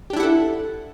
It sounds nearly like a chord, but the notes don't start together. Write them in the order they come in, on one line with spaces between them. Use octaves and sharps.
G4 D4 E4 F#5 A4